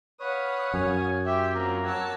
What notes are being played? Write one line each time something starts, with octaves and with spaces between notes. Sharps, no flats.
B4 C#5 F5 F#5 D#6
F#2 G#5
G4 E5 G5 C6
F#3 A#3 C4 F4 A#4
C#5 F#5 A5 E6